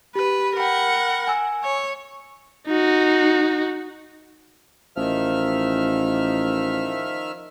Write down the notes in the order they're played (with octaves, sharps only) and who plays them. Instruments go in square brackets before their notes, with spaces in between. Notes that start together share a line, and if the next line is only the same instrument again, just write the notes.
[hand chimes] G4 [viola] B4
[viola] A#4 F#5 [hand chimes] G5 B5
[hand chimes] G#5 E6
[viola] C#5
[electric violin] D#4 F#4
[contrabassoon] A1 [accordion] D#3 E5 F6 [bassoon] F3